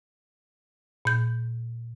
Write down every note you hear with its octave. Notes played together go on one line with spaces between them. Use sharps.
A#2 G6